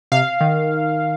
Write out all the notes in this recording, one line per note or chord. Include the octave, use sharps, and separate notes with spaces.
C3 F5
D#3